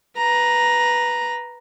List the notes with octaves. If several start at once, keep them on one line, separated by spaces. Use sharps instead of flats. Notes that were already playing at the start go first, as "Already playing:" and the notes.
B4 A#5